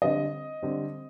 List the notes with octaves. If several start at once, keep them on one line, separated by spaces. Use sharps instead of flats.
D3 G3 C4 D#5
D3 G3 C4